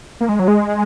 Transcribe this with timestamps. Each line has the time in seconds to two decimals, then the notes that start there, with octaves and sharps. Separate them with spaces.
0.21 A#3
0.29 G#3
0.39 F#3
0.48 G#3